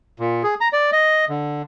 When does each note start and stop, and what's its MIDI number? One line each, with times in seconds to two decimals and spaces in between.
0.20 0.43 46
0.43 0.54 68
0.61 0.68 82
0.73 0.90 74
0.93 1.25 75
1.29 1.62 50